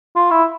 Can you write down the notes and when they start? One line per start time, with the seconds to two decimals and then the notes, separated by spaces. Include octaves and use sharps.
0.16 F4
0.31 E4